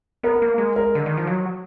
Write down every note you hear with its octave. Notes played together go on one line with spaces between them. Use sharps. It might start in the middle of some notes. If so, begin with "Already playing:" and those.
B3 A#4
A#3
G#3
A#4
D3
D#3
F3
F#3